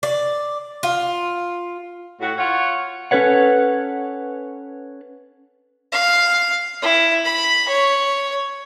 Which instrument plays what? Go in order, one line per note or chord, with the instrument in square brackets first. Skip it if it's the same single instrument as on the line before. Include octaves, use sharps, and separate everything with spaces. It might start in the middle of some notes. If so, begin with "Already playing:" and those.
[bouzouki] D5
F4
[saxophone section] A2 F#4
F4 C#5 F#5
[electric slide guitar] C#4 A4 B4 C#5 F#5
[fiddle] F5
E4
B5
C#5